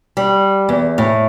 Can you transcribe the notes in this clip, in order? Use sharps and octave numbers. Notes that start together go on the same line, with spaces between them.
G3
E2
A2